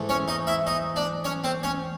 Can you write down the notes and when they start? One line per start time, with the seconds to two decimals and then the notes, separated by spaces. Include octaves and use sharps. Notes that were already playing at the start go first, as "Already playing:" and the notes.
Already playing: G#2 E3 A3
0.09 C#4 C#5
0.28 D#4 D#5
0.47 E4 E5
0.67 D#4 D#5
0.96 D4 D5
1.24 C#4 C#5
1.44 C4 C5
1.63 C#4 C#5